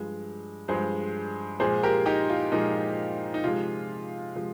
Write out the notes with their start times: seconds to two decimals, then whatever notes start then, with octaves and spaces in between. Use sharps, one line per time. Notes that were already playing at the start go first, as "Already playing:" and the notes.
Already playing: G2 F3 G#3
0.68 G2 F3 G#3 G#4 C5
1.60 A#2 F3 G#3 G#4 C5
1.83 G4 A#4
2.06 D#4 G4
2.29 F4
2.52 A#2 F3 G#3 D#4
3.34 D#4
3.44 C3 F3 G#3 F4
4.35 C3 F3 G#3